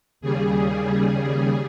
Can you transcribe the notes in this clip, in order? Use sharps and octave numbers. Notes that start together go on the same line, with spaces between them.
D#2 C#3 G3 G#4